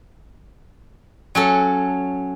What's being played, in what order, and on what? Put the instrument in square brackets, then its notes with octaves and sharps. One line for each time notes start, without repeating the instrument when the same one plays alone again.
[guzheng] F#3 C#4 A4